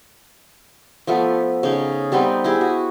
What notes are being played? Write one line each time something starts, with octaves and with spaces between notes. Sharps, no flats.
F3 A3 B3
C#3 D#4
G3 B3 C4 D#4
E4 G4 G#4
F#4